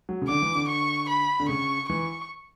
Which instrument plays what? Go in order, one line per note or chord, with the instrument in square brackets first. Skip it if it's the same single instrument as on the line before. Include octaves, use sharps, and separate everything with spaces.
[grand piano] F#3
C#3
[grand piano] D3 [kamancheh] D6
[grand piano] E3
D3
[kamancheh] C#6
B5
[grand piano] D3
[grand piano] C#3 [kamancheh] C#6
[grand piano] E3 [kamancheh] C#6